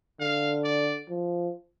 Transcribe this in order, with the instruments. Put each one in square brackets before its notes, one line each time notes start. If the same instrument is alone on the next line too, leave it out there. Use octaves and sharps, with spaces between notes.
[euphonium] D3 [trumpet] F5
[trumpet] D5
[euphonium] F3